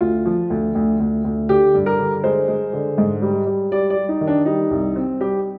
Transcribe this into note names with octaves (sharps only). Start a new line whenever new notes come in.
D2 F4
F3
D2
D2
D2
D2
D3 G4
G2
A#4
D3
G#3 C5
G#3
D3
G#2
G3
G3
G3 D5
D5
G3
D#4
D#3
D4
G3 D#4
C2
C4
G3 G4